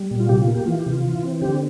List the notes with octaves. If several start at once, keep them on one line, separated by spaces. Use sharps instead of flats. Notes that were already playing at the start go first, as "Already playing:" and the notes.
Already playing: G3
A#2
F4
C3 G4
F4
A#3
G4
E3 F4
G4
C3
F4
E3
C4
D3 G4